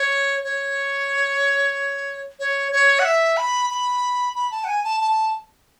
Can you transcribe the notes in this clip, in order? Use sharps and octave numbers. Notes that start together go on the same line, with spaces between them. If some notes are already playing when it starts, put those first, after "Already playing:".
Already playing: C#5
C#5
C#5
C#5
F#5
E5
B5
B5
B5
A5
F#5
G#5
A5
A5